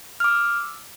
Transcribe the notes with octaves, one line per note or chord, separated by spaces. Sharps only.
D6 E6 F6